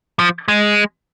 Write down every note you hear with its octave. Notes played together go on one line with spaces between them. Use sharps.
F3
G#3